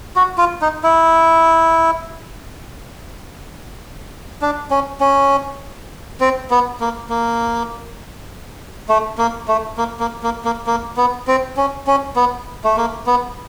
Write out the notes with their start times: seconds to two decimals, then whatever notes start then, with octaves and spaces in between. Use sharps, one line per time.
0.16 F#4
0.38 F4
0.62 D#4
0.83 E4
4.42 D4
4.71 C#4
5.01 C#4
6.20 C4
6.51 B3
6.80 A#3
7.09 A#3
8.89 A3
9.18 A#3
9.48 A3
9.77 A#3
10.00 A#3
10.23 A#3
10.45 A#3
10.67 A#3
10.97 B3
11.27 C4
11.57 C#4
11.87 C#4
12.16 B3
12.64 A3
12.77 A#3
13.07 B3